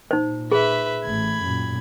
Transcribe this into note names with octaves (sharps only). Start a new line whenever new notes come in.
A#2 D#4 C5
G#4 B4 E5
A1 A3 B5 G#6
F#2 A#2